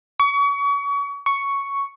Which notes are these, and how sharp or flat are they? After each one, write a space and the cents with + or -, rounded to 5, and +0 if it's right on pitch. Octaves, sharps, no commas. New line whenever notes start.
C#6 +35
C#6 +5